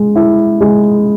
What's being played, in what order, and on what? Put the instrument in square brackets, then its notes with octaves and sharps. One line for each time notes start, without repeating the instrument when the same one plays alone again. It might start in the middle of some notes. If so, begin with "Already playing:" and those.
Already playing: [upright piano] G#3
E4
G#3